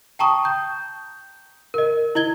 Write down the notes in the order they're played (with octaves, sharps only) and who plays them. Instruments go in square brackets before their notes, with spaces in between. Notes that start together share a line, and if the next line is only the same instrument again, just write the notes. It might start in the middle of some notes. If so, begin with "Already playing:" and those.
[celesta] G5 A5 A#5 C#6 D#6
G6
A#4 D#5
E4 D#5 G#6 G7